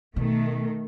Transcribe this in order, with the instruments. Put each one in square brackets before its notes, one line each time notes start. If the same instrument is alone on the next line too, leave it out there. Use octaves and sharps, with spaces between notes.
[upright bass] B2 [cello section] D#3 A3